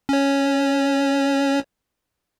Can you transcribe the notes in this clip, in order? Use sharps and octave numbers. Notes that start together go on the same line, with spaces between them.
C#4 C#5